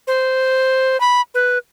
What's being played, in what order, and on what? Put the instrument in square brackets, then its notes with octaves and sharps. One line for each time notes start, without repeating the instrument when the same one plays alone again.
[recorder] C5
B5
B4